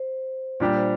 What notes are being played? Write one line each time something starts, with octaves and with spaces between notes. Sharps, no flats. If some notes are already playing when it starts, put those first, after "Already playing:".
Already playing: C5
A#2 G3 D4 G4 D5
C5